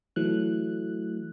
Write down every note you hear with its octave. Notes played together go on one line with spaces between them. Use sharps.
E3 F#3 A3 F#6